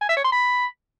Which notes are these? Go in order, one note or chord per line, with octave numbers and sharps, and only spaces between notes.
G#5
E5
C#5
C6
B5